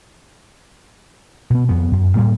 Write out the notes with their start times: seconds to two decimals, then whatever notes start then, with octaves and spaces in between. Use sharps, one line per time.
1.50 B2 B3
1.69 F2 B3
1.92 F#2
2.15 A2 G3 A#3